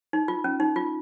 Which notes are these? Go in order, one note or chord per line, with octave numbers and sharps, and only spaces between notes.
D#4
F4
C#4
D#4
F4